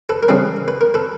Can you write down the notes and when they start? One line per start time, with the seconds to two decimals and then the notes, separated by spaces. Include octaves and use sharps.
0.09 A4 B4
0.23 A#4
0.28 C#3 E3 G3 C4 A4 B4
0.68 B4
0.81 A#4
0.94 A4 B4